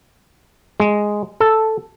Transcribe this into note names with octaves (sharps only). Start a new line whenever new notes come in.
G#3
A4